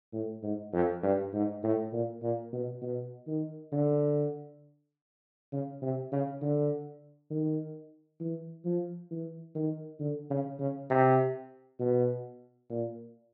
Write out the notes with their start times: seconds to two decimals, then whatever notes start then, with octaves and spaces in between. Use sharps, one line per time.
0.13 A2
0.43 G#2
0.73 F2
1.03 G2
1.34 G#2
1.63 A2
1.93 A#2
2.22 A#2
2.53 B2
2.82 B2
3.27 D#3
3.72 D3
5.52 C#3
5.82 C3
6.12 C#3
6.42 D3
7.31 D#3
8.20 E3
8.65 F3
9.11 E3
9.55 D#3
10.00 D3
10.31 C#3
10.60 C#3
10.90 C3
11.80 B2
12.70 A#2